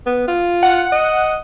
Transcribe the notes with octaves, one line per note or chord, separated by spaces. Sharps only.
B3
F4
F#5
D#5